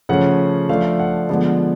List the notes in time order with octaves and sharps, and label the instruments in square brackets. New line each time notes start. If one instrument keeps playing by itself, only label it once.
[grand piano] C#3 F3 A3 C#4 F#5
F3 A3 D4 F5
F#5
D3 F3 G#3 B3 D4